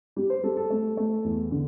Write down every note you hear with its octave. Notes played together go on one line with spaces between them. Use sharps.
G3 G4
C5
G3 A4
A4
A3
A3
E2
D3